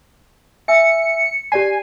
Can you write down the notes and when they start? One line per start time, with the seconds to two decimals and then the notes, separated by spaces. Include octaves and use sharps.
0.68 E5 G#5 E6 C#7
1.52 G4 D5 G#5 C7